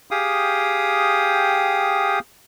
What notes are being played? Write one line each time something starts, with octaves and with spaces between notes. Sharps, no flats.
G4 G#4 F5 G5 D#6